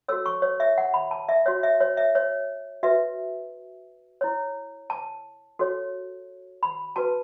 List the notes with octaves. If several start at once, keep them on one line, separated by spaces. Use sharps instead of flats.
F#4 A4 C#5 E6
C#6
C#5
E5
F#5
B5
A5
E5
F#4 C#5
E5
C#5
E5
C#5
F#4 B4 E5
E4 C#5
A5
F#4 A4 C#5
B5
F#4 B4 A5